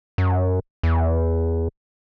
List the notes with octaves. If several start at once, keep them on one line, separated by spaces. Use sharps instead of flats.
F#2
E2